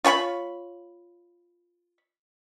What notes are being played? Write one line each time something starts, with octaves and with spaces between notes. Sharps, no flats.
F4 C#5 G#5 B5